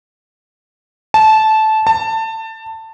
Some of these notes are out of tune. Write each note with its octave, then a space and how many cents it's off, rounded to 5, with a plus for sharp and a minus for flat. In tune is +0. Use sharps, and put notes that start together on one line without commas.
A5 -15
A5 +20